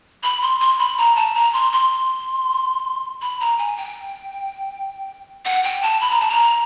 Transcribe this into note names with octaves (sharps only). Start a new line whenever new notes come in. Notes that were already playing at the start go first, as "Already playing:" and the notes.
B5
C6
C6
B5
A#5
A5
A#5
C6
C6
B5
A#5
G#5
G5
F#5
G5
A5
B5
A#5
A5
A#5